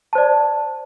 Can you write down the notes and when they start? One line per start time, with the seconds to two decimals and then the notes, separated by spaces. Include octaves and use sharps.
0.13 A5
0.15 C5
0.18 D5